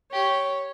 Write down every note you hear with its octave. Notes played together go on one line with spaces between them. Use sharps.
G4 C#5